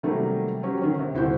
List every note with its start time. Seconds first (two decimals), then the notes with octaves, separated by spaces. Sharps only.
0.03 C3 D#3 F#3 G3 A3 A#3
0.63 F#3 C#4 G4
0.82 D3 D#3 C#4
0.99 C3
1.14 D#1 D3 E4 F#4 C5 G6